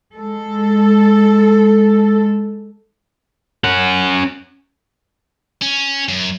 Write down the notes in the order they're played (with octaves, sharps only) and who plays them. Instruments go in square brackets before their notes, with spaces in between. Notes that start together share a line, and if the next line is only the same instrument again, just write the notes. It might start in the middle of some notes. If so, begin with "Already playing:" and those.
[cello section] G#3 A4
[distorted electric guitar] C#4 F#5
C#4
F#2